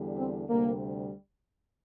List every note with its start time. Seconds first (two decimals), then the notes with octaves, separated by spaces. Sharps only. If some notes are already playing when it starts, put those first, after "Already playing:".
Already playing: E2 D3 G3
0.17 C4
0.48 D2 C3 G3 A#3